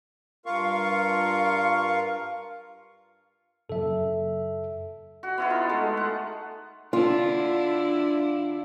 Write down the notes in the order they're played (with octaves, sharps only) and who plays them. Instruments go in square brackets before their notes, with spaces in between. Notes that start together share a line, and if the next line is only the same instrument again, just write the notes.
[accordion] G2 F4 A#4 F5 C#6
[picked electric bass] F#2 C#3 F#3 [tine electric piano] A4 E5
[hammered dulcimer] F#4
B3 E4 F4
D#4
G#3 A3
F#5
[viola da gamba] D3 D4 E4 [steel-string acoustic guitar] F4